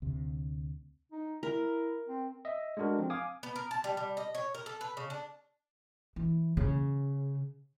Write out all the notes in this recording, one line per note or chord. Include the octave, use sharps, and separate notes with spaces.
D2 C3
D#4
E4 A#4
C4
D#5 E5
G#3 A3 D4 F#4 A#4
F3 C4
F5 G#5 D6 D#6
B3
A#4
A5
G3
G3
D#5
C#5
A#4
A4
B4
C#3
D4
E3
C#3